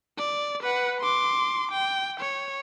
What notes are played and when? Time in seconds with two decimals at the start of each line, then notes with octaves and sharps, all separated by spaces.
0.19 D5
0.63 B4 F#5
1.01 C6 D6
1.71 G5
2.20 C#5